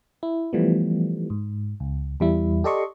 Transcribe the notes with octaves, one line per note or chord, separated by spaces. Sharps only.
E4
E3 F3 G3 A3 B3
G#2
C#2
E2 G3 E4
G4 A4 D5 D#5 C6 C#6